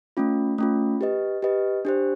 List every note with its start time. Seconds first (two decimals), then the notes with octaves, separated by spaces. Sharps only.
0.17 A3 C#4 F4
0.58 A3 C#4 F4
1.01 G4 B4 D#5
1.42 G4 B4 D#5
1.85 D4 G4 C5